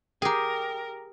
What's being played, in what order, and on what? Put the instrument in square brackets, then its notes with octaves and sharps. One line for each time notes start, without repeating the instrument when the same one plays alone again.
[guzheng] G4 G#4 [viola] A#4 [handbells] G5 A#5